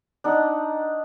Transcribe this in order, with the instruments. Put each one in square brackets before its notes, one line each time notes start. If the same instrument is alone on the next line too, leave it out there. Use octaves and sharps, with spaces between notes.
[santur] D4 D#4 F#5